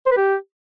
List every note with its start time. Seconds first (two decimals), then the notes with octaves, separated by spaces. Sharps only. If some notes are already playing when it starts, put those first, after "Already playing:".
0.06 C5
0.11 B4
0.17 G4